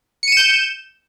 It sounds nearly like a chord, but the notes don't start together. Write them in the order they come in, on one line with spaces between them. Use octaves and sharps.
C#7 D#7 E7 G6